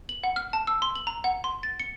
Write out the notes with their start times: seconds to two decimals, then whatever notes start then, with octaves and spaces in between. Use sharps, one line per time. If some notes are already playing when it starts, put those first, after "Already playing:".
0.09 F#7
0.23 F#5
0.36 F6
0.53 A5
0.67 E6
0.82 C6
0.95 F#7
1.07 A#5
1.24 F#5
1.44 C6
1.63 A6
1.80 C#7